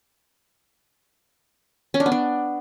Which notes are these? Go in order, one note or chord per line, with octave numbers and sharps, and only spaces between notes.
C#4
D4
B3
D4